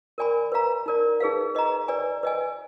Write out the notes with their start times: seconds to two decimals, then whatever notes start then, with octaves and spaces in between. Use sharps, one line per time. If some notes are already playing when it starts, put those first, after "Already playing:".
0.18 A#4 D5 G#5 B5
0.52 B4 F5 A#5
0.86 D#4 A#4 D5
1.20 D#4 G#4 B4 F5
1.55 B4 D#5 A#5
1.88 B4 D5 G#5
2.23 B4 D#5 G#5